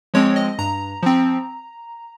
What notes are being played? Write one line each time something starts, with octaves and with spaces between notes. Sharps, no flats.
F3 G#3 C4 C#5
D#5
G2 A#5
F3 C4